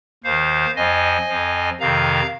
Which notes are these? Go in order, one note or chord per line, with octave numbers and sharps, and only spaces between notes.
D#2 D#3 C5 F5
F2 F3 D#5 G#5
F2 F3
F2 C3 D#3 F5 A#5